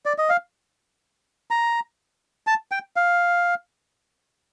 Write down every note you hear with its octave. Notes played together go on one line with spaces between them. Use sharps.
D5
D#5
F5
A#5
A5
G5
F5